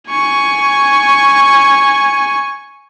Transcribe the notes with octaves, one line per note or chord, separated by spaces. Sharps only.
G#5 C#6